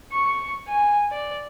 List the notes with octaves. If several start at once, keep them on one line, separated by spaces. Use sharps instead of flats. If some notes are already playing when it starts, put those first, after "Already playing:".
C#6
G#5
D5